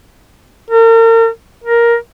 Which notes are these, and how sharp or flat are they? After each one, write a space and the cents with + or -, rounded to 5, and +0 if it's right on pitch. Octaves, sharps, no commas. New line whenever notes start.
A#4 -40
A#4 +10